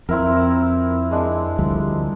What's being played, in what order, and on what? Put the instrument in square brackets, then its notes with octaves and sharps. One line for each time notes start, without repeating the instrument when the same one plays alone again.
[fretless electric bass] F2 [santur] C4 E4 A#4
[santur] G#3 D4
[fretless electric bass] D2 F3 G3